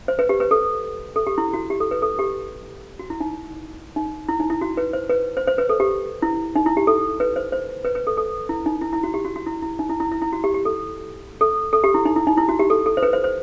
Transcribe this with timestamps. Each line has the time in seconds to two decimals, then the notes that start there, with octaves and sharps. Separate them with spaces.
0.08 C5
0.19 B4
0.29 G4
0.40 B4
0.51 A4
1.16 A4
1.27 G4
1.38 E4
1.53 F#4
1.70 G4
1.80 A4
1.91 B4
2.02 A4
2.19 G4
2.99 F#4
3.10 E4
3.20 D#4
3.96 D#4
4.29 E4
4.40 D#4
4.50 E4
4.61 F#4
4.77 B4
4.93 C5
5.10 B4
5.37 C5
5.47 C5
5.58 B4
5.69 A4
5.80 G4
6.22 E4
6.56 D#4
6.66 E4
6.77 G4
6.87 A4
7.20 B4
7.36 C5
7.52 C5
7.85 B4
7.95 B4
8.07 A4
8.18 A4
8.49 E4
8.66 D#4
8.81 E4
8.93 E4
9.03 F#4
9.14 G4
9.25 F#4
9.36 F#4
9.46 E4
9.62 E4
9.79 D#4
9.90 E4
10.00 E4
10.12 E4
10.22 E4
10.33 F#4
10.44 G4
10.54 G4
10.65 A4
11.41 A4
11.73 A4
11.84 G4
11.94 E4
12.05 D#4
12.16 E4
12.27 D#4
12.38 E4
12.49 F#4
12.59 G4
12.70 A4
12.86 A4
12.97 C5
13.03 B4
13.13 C5
13.24 C5